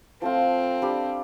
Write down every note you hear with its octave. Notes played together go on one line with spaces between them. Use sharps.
F3 A3 C4 F4
G3 D4 G4 D5